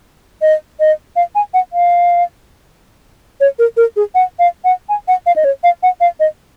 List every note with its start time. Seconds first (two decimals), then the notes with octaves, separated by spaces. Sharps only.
0.42 D#5
0.80 D#5
1.16 F5
1.35 G#5
1.54 F#5
1.73 F5
3.40 C#5
3.59 A#4
3.77 A#4
3.96 G#4
4.15 F#5
4.39 F5
4.64 F#5
4.89 G#5
5.08 F#5
5.26 F5
5.36 D#5
5.44 C#5
5.63 F5
5.83 F#5
6.00 F5
6.20 D#5